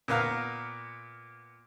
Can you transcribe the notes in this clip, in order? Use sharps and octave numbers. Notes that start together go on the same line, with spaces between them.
A#2 B3 F5 A#5